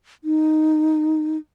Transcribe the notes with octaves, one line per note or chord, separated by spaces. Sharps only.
D#4